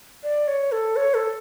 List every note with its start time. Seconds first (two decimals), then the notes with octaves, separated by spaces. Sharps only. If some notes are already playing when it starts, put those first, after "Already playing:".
0.24 D5
0.48 C#5
0.72 A4
0.96 C#5
1.14 A4